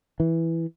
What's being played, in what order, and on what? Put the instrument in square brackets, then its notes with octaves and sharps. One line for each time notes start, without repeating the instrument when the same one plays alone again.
[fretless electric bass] E3